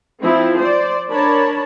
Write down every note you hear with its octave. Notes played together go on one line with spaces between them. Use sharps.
F3 C4 E4
C5 D5
D4 A#4 C#5 A5 B5